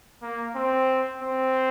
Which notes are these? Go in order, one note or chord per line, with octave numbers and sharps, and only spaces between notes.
A#3
C4
C4